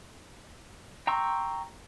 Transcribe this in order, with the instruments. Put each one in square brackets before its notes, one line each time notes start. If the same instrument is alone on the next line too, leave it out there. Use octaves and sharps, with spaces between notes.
[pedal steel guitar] G5 A#5 C6 C#6 E6